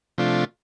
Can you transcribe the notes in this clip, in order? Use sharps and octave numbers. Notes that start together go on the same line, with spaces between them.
C3 F3 A3 D4 F4